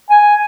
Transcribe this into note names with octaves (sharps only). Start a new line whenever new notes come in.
G#5